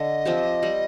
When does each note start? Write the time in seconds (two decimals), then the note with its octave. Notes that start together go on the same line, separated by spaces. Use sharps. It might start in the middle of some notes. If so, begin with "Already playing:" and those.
Already playing: D3 D#5
0.25 F3 C4 G4
0.63 G3